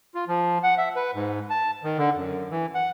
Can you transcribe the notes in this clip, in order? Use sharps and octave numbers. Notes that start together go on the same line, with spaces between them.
F4
F3
F#5
E5
B4
G#2
A5
D#3
D3
F#2
E3
F#5